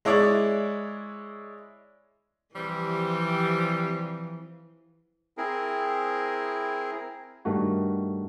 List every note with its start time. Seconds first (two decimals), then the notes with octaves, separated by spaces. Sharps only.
0.05 G#3 E4 C#5 D5
2.55 C3 E3 F3 G3 C4
5.37 C4 E4 G#4 A#4
7.45 G2 D#3 A3 F#4